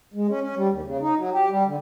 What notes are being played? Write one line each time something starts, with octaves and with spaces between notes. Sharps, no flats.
G#3
C#4
C#4
G3
D#2
C#3
D#4
F#3
G4
G3
D3